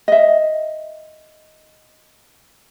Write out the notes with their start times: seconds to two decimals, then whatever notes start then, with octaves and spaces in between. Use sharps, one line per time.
0.08 D#5 E5